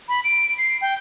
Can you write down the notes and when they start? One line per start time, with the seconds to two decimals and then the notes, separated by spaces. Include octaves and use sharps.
0.09 B5
0.24 D7
0.58 C7
0.81 G5